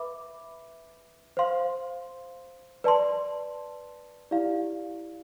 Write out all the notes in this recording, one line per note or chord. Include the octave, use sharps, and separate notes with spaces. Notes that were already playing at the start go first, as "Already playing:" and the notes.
Already playing: B4 E5 B5 D6
C5 F5 C6
B4 D5 A5 C6
E4 G4 D5 F5